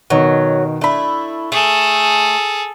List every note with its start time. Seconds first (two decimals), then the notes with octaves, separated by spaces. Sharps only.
0.10 B2 D#3 F#3
0.81 A3 D4 E4 B5
1.52 A3 G#4 A4